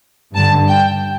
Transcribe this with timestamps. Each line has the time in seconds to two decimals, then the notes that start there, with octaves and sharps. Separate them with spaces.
0.35 G2 D3 A5
0.68 G5